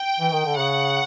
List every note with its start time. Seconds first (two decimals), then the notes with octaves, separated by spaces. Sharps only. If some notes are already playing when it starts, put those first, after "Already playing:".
Already playing: G5
0.20 E3
0.32 D#3
0.45 D3
0.57 C#3 F#5